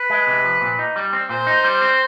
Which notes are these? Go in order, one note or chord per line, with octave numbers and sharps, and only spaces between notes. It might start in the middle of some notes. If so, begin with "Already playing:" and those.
Already playing: B4
G#3
C3
F3
A#2
D#4
G3
C4
A#2 C5
D#4
G3
C4